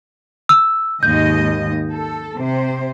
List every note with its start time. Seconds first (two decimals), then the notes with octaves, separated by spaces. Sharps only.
0.49 E6
1.03 D#2 G#2 D#5 G6
1.92 A4
2.38 C3 C5